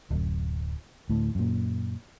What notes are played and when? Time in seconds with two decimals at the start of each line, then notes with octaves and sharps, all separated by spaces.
0.10 D1 F#2
1.10 D2 A2
1.35 F#2 A#2